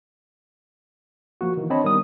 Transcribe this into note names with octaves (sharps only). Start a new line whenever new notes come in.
F3 A#3 F#4
D#3 E3
C4 D4 C#5 D#5 A5 B5
D#3 G3 B3 D#6